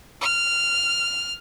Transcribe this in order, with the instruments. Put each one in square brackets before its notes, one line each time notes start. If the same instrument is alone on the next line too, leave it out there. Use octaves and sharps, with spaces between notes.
[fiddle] F6